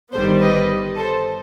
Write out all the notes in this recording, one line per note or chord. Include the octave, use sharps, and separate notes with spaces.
G1 G2 D#3 G3 B3 A4 C5
B4 D#5
A4 C5